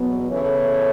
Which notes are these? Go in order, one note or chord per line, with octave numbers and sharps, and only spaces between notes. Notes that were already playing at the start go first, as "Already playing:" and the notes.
Already playing: E2 B2 F#3 B3
C#3 E3 B3 A4 C#5